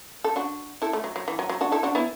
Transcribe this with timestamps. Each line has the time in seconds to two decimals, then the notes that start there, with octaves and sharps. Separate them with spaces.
0.24 A4
0.36 D4 F#4
0.82 E4 A4
0.93 A3
1.04 F#3
1.16 F#3
1.28 E3
1.39 F#3
1.49 F#3
1.61 D4 F#4
1.72 E4 A4
1.83 D4 F#4
1.95 B3 E4